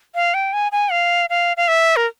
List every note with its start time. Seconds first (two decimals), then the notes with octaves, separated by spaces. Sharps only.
0.15 F5
0.34 G5
0.53 G#5
0.72 G#5
0.92 F5
1.30 F5
1.57 F5
1.68 E5
1.96 A#4